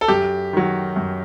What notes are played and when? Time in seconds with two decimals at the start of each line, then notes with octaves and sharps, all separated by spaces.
0.01 A4
0.08 F#2 G4
0.53 D#3 F#3
0.96 F#2